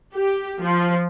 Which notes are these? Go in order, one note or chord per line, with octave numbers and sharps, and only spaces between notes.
G4
F3